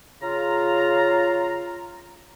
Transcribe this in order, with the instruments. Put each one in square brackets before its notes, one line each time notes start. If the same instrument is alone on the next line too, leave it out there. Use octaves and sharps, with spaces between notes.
[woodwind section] C#3 F4 A#5